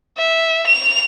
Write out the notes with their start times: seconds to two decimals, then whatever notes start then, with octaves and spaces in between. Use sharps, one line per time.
0.18 E5
0.67 F7